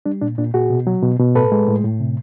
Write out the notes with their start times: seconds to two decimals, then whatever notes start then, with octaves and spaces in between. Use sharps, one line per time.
0.06 G3 D4
0.22 A#2 D4
0.38 A#2 D4
0.54 A#2 F#4 G#4
0.70 B2
0.87 F#3
1.03 B2
1.19 B2
1.35 A2 A4 B4
1.52 G#3
1.68 A2
1.84 A2
2.00 C3